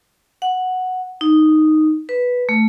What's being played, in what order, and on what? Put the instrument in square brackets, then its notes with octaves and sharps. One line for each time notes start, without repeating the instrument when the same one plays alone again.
[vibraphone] F#5
D#4
B4
A3